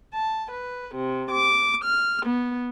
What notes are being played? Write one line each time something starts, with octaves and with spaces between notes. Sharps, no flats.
A5
B4
C3
D6
F6
B3